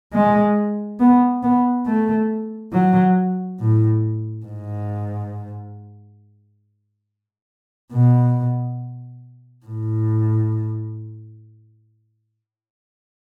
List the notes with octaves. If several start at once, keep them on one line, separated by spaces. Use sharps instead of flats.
G#3
B3
B3
A3
F#3
A2
G#2
B2
A2